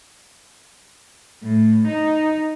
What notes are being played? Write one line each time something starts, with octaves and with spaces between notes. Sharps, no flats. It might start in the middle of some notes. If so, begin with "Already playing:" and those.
A2
D#4